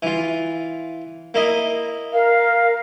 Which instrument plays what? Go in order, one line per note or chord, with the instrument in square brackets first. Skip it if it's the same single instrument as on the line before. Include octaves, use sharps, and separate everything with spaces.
[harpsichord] E3 F4
A#3 E4 D#5
[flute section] A#4 [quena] F5